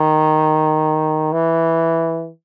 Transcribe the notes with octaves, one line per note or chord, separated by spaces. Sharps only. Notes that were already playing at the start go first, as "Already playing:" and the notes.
Already playing: D#3
E3